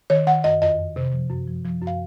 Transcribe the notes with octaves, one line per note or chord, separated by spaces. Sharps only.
D#3 C#5
D#3 F#5
F#2 D#5
F2 D#5
F2
C3
F3
F#2
F3
F3
F#2
F5